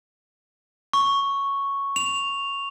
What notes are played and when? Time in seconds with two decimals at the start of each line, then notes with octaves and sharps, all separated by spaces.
0.93 C#6
1.96 F7